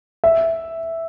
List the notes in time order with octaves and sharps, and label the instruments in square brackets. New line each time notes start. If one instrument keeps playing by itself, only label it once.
[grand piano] E5